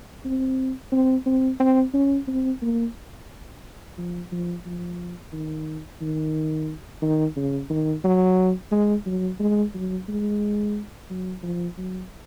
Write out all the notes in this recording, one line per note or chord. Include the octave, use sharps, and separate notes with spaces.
C4
C4
C4
C4
C#4
C4
A#3
F3
F3
F3
D#3
D#3
D#3
C#3
D#3
F#3
G#3
F#3
G#3
F#3
G#3
F#3
F3
F#3